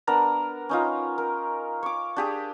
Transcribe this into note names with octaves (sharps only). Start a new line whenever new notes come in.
B3 D4 A#4 A#5
C#4 D#4 F4
A#4
C#5 D6
D4 G4 G#4